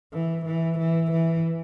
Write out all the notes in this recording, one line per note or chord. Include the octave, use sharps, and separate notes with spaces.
E3
E3
E3
E3